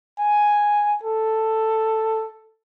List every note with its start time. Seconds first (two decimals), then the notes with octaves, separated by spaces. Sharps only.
0.19 G#5
1.04 A4